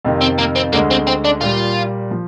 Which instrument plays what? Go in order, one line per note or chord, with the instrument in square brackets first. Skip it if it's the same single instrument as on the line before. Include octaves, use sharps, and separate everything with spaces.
[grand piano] F2 C3 D#3
[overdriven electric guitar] C4
A#3
C4
[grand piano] D2 D3 G#3 [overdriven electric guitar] A#3
[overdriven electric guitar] C4
C4
D4
[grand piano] A#2 G3 A#3 [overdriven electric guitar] F4
[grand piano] F3